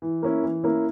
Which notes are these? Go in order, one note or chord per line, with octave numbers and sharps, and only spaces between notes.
E3
A#3 C#4 E4
E3
A#3 C#4 E4